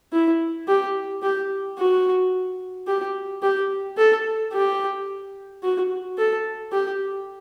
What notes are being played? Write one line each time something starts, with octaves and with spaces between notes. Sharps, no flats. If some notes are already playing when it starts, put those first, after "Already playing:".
E4
G4
G4
F#4
G4
G4
A4
G4
F#4
A4
G4